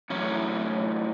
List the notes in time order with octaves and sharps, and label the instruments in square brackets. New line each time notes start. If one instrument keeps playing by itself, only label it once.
[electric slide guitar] A2 F#3 C#4 E4